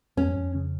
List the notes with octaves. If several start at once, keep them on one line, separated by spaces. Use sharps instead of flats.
F2 C#4
F2
C#3